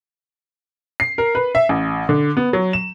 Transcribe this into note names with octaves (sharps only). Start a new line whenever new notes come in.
C7
A#4
B4
E5
A1
D3
B3
F#3
E7